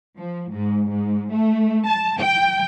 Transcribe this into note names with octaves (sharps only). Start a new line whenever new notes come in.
F3
G#2
G#2
A3
A5
G5